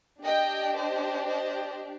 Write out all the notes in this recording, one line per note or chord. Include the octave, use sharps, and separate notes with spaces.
D4 G4 D#5 G5
C5 D#5
C5 D#5